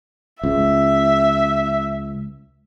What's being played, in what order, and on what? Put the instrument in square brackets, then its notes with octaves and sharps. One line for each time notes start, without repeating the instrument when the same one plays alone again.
[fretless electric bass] C#2 [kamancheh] E5